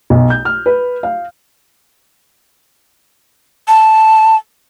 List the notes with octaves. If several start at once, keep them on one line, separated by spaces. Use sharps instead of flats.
B1
G6
F6
B4
F5
A5